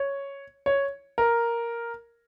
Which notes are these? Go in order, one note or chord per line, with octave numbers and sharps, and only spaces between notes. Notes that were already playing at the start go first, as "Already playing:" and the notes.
Already playing: C#5
C#5
A#4